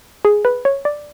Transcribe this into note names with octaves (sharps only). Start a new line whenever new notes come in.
G#4
B4
C#5
D5